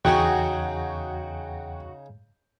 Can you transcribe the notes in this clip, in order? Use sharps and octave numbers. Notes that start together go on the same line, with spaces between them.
E2 C#3 D#4 F#4 G#4 F#5 G5